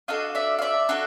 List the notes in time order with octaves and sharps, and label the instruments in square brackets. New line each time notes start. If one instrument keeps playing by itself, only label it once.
[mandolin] D4 F#4 A4 D#5 F5
D5 E5
F5
D5 E5
D4 F#4 A4